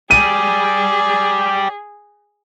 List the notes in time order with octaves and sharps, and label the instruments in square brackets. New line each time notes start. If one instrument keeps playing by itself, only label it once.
[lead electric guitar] G4 D5 [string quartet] G#4 [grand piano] D#7